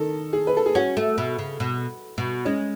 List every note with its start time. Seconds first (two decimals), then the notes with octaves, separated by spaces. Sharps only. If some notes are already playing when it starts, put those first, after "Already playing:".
Already playing: D#3 A4
0.33 G#4
0.47 B4
0.57 A4
0.66 G#4
0.75 C#4 F#4
0.97 A3
1.18 B2
1.39 C#3
1.60 B2
2.18 B2
2.45 G#3 C#4